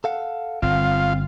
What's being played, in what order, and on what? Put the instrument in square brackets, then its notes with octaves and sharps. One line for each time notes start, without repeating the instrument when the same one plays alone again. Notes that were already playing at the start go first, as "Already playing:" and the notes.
[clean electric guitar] A4 F5 F#5
[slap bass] G1 [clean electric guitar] C4 [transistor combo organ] F4